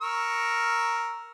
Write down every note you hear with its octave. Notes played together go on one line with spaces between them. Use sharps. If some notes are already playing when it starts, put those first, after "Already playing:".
A#4 C#6 E6